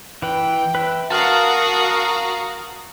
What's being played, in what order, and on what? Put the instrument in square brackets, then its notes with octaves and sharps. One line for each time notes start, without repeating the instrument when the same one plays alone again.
[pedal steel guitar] E3 B4 [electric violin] G5
[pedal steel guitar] B4 E5
[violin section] F#4 F5 A#5 [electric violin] A#4 D#6 [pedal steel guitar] A5 F6